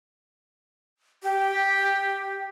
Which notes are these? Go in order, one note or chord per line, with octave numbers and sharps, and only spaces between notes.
G4